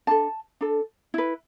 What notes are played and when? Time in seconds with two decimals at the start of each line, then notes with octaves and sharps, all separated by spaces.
0.07 D4 A4 A5
0.61 D4 A4
1.14 E4 B4